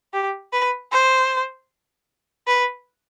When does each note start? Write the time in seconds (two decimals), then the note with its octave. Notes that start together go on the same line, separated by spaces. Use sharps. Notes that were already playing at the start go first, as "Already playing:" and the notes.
0.14 G4
0.53 B4
0.92 C5
2.47 B4